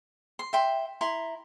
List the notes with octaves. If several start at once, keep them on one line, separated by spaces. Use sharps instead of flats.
C6
E5 G5 C6
E4 A#5 C6